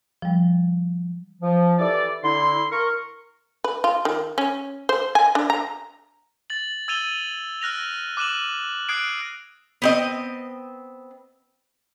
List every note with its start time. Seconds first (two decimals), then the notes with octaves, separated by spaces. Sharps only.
0.22 F3 G3
1.41 F3
1.79 E3 E4 G4 A4 D5
2.23 D3 E4 C6
2.71 A#4 C#6
3.64 B4
3.84 F4
4.05 D#3
4.38 C#4
4.89 C5
5.15 G#5
5.35 D4
5.50 A#5
6.50 A6 F#7
6.88 E6 G#6 A6 D#7 F7 G7
7.61 F6 F#6 A#6 F7
8.17 D6 F#6 D#7 E7 F#7
8.89 D#6 F#6 G#6 C7 D7
9.82 B3 C4 D#5